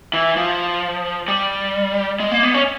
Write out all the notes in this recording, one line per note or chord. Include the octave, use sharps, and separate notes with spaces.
E3
F3
G3
G#3
A#3
B3
C#4